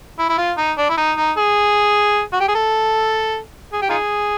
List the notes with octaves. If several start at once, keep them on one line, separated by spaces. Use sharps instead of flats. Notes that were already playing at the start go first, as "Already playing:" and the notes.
E4
E4
F4
D#4
D4
E4
D#4
D#4
G#4
F#4
G4
G#4
A4
G#4
G4
D#4 F4 G#4